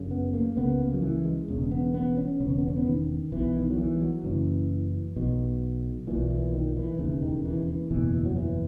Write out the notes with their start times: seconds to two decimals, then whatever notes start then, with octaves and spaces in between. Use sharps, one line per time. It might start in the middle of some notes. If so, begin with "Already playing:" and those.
Already playing: F#1 F#2 C#3
0.11 B3
0.34 A#3
0.57 C#2 C#3 B3
0.80 A#3
0.94 F#3
1.02 E3
1.25 G#3
1.48 E1 E2 C#3
1.71 B3
1.94 B3
2.17 C#4
2.40 E1 E2 C#3 B3
2.50 C#4
2.58 B3
2.68 C#4
2.76 B3
2.86 D#3
3.32 B1 B2 E3
3.55 D#3
3.70 F#3
3.78 E3
3.96 G#3
4.00 F#3
4.23 F#1 F#2 C#3 E3
5.16 B1 B2
6.07 B1 A#2 E3
6.30 E3
6.53 D#3
6.76 E3
6.99 E1 D#2 C#3 E3
7.22 D#3
7.45 E3
7.67 E3
7.91 F#1 E2 B2 E3
8.14 E3
8.25 F#3
8.36 E3